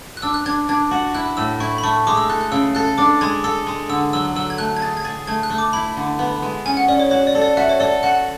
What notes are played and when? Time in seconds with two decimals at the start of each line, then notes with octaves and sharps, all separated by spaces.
0.17 F#6
0.22 D4 E6
0.34 F#6
0.46 D4 G#6
0.69 D4 G#6
0.91 F#4
1.15 E4 F#6
1.37 A2 E6
1.60 E4 C#6
1.78 B5
1.84 A3 C#6
2.07 G#3 D6
2.17 E6
2.30 A4 F#6
2.41 F#6
2.52 C#3 E6
2.75 A4 F#6
2.98 D4 D6
3.21 G#3 G#6
3.44 A4 E6
3.66 G#3
3.89 D3 E6
4.13 F#3 E6
4.35 F#3 E6
4.50 G#6
4.58 A3 F#6
4.77 G#6
4.81 G#4 A6
4.97 G#6
5.04 G#4 A6
5.27 A3 G#6
5.43 F#6
5.50 A3
5.58 D6
5.73 E4 B5
5.97 D3
6.19 B3
6.42 G#3
6.66 C#4 G#5
6.77 F#5
6.88 C#4 D5
7.00 C#5
7.11 F#4 C#5
7.27 D5
7.35 A4
7.42 D5
7.57 F#4 E5
7.69 C#5
7.80 A4 D5
8.03 F#4 F#5